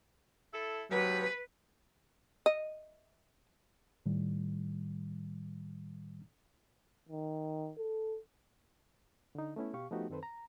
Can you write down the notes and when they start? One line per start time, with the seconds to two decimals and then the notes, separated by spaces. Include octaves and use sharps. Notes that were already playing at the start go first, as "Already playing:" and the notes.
0.54 E4 A4
0.91 D#2 C3 F#3 B4
2.46 D#5
4.06 A2 D#3 G3
7.09 D#3
7.78 A4
9.35 D3 D#4
9.56 A3 B3 C#4 E4
9.73 B2 G4 F5 C#6
9.91 F3 A3 B3 D#4 F#4 G4
10.10 F#2 D#3 C4 A4 B4 C5
10.23 A#5